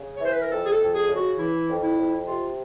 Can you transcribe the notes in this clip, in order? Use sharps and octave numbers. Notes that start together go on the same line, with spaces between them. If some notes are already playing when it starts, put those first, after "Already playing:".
Already playing: C#3
C#5
E3 C5
B4
A#4
F2 A4
G#4
A4
F2
G#4
C#3
F#4
E3 E4
F2
E4
F2
C3 F4